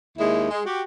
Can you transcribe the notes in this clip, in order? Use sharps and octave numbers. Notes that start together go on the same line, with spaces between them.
D#2 G#3 E4
G#3
F#4 G4